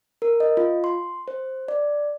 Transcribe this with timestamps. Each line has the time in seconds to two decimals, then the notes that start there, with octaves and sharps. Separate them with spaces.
0.22 A#4
0.40 D#5
0.57 F4
0.84 C6
1.28 C5
1.68 D5